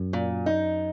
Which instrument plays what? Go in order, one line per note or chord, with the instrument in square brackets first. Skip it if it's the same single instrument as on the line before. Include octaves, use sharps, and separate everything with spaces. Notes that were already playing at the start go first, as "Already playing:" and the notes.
Already playing: [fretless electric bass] F#2
[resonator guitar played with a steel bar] A#2
D#4